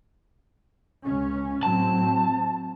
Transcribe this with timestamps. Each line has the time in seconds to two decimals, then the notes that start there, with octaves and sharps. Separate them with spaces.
1.03 C#2 C#4
1.63 A2 F#3 C4 A5